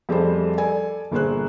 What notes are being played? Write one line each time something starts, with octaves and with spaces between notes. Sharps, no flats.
F2 G3 A3 G#4 C5
A4 D5 G#5
G1 A#2 A#3 G#4 C5 F#6